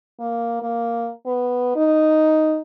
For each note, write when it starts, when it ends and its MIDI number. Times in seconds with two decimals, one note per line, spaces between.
0.20 0.62 58
0.62 1.10 58
1.26 1.73 59
1.76 2.60 63